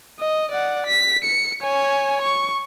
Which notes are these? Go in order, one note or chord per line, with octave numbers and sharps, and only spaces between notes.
D#5
D5 F#5
B6
C#7
C#5 G#5
C#6